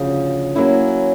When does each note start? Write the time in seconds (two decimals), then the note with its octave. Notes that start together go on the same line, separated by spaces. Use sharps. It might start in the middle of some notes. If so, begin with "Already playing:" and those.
Already playing: D2 C#3 F3
0.56 F#3 A#3 C#4 E4